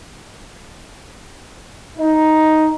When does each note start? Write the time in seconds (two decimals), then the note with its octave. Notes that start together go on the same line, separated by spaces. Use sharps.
1.97 D#4